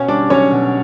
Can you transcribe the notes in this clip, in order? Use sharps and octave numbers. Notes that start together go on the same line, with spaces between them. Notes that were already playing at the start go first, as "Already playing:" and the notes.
Already playing: B2 C#4 C#5
G3 D4 D5
B1 C#4 C#5
B2